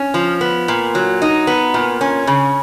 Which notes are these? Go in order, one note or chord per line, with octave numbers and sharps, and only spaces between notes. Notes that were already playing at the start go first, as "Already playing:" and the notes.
Already playing: C#4
F3
B3
A#2
F#3
D#4
B3
A#2
C#4
C#3